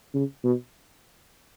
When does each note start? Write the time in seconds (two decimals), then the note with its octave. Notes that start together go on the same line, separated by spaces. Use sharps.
0.14 C#3
0.44 B2